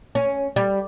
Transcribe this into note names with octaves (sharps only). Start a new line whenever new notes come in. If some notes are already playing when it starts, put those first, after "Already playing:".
C#4
G3